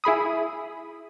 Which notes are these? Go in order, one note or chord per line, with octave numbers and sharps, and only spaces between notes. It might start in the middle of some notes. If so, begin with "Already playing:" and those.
E4 G#4 B5 D#6